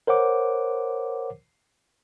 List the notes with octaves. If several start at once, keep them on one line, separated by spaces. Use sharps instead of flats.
A#4 C5 C#5 F#5 D6